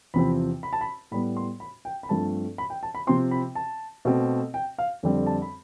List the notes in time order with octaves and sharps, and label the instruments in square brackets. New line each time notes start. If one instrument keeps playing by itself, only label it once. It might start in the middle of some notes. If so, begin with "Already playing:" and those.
[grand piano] E2 C3 F3 C4 B5
B5
A5
B5
A2 G3 B3 B5
C6
B5
G5
B5
G2 F3 A3 C4 A5
B5
G5
A5
B5
C3 F3 C4 C6
B5
A5
B2 A3 C4
G5
F5
F2 D3 G3 C4
A5
B5